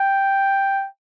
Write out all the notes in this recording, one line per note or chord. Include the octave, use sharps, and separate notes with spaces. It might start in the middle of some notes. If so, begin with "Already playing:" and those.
Already playing: G5